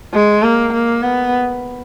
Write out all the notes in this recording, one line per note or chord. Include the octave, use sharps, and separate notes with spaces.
G#3
A#3
A#3
B3